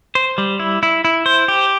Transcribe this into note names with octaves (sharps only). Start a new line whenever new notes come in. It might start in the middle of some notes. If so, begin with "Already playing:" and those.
C5
G3
E4
E4
E4
C5
G4